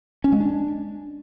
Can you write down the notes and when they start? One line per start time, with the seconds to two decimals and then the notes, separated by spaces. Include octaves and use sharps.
0.24 C#4
0.32 G#3
0.40 D4